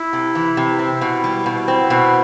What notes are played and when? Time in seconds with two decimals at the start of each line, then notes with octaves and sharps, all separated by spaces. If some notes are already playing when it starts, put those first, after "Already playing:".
Already playing: E4
0.13 C3
0.35 E3
0.57 C3
0.79 C4 E4
1.01 B2
1.24 G3
1.46 B2
1.68 C4
1.90 B2